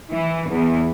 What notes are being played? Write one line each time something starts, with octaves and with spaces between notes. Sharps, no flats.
E3
E2